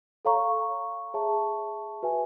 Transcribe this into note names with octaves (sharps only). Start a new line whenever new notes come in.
A4 C#5 F5 A#5 C#6
G#4 C#5 E5 A5 C#6
F#4 B4 E5 G#5